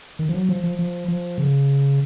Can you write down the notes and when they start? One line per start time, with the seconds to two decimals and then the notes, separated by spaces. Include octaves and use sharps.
0.19 D#3
0.29 F3
0.34 F#3
0.49 F3
0.64 F3
0.79 F3
1.08 F3
1.38 C#3